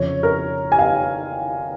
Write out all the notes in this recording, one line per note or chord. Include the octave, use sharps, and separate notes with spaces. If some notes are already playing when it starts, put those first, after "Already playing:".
Already playing: F2 C#3 C#5
A#4
G#5
F5